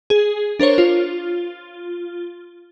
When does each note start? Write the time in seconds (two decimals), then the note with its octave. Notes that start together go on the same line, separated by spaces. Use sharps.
0.10 G#4
0.59 D4 A#4 C5 C#5
0.78 F4